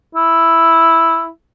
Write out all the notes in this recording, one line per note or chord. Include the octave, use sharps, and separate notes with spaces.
E4